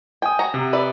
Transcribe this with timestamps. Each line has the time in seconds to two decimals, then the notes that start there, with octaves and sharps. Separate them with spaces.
0.22 G5 G#5 D#6
0.39 F#4 A#5
0.54 C3
0.73 B4 D5 E5